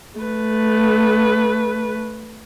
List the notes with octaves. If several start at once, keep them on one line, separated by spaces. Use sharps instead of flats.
A3 B4